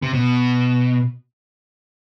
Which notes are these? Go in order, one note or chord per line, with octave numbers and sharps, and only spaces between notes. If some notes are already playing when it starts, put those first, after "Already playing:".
C3
B2